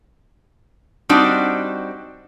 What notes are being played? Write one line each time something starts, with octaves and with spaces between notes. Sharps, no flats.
G3 C4 D4 D#4 F#4